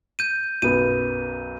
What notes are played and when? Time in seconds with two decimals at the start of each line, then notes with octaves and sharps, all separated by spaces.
0.19 G6 D#7
0.62 B1 F#2 B3 D#7